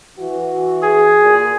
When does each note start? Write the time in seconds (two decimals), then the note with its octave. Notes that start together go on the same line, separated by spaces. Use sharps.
0.19 E3 F#4
0.82 G#4
1.22 A#2